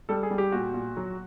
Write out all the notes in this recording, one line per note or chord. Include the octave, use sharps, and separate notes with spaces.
G3 A4
G#4
G3
G4
A#2 F#4
A#2
F#3